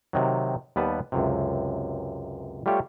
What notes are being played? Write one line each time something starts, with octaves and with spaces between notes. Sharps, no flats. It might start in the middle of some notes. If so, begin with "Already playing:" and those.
C3 D#3 F#3
D#2 G3 B3 B4 A5
C#2 F#2 C3
G3 A3 F4 G4 C#5